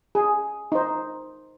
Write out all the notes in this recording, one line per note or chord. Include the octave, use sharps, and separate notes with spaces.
G#4
D#4 C5